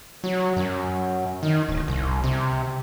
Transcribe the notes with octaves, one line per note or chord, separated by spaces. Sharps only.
F#3
F#2
D#3
D1
C2
C3